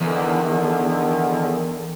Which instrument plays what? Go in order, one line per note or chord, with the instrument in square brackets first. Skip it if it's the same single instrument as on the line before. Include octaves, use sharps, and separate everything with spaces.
[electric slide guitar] E2 [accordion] D3 D#3